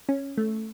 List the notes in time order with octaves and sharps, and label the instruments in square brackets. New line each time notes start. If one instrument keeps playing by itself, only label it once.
[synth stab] C#4
A3